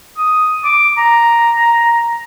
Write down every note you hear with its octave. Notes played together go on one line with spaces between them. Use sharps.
D#6
D6
A#5